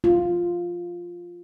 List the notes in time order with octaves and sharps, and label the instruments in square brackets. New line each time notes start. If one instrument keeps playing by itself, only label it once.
[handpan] F4